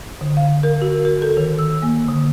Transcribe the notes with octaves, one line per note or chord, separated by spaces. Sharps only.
D3
F5
A#4
F#4
A#4
A4
D#3
E6
A#3
D3